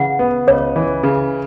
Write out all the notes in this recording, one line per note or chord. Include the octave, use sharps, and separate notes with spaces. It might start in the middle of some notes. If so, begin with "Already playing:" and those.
Already playing: C#3 E3 F#5
B3
C#2 C#5
E3
C#3